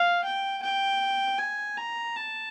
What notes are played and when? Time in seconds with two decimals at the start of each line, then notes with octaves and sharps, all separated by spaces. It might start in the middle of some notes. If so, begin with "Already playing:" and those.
Already playing: F5
0.24 G5
0.62 G5
1.38 G#5
1.77 A#5
2.16 A5